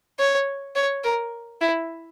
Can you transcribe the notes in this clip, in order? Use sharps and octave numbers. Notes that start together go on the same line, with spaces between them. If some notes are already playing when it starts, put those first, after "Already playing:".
C#5
C#5
A#4
E4